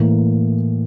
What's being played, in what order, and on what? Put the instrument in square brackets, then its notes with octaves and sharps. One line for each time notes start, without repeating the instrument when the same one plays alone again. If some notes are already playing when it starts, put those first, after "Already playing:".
Already playing: [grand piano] A2 E3 A#3